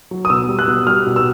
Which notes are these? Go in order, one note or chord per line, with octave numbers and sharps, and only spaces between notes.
F#3
D#6
B2 E6
G3
F#6
B2
G3 F6
B2
E6